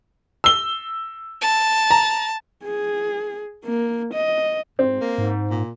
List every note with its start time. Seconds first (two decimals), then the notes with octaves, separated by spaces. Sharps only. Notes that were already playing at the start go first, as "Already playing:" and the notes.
0.44 E6 G7
1.42 A5
1.91 A#5
2.64 G#4
3.64 A#3
4.14 D#5
4.79 G#2 C4
5.01 A#3
5.18 G#2
5.50 A#2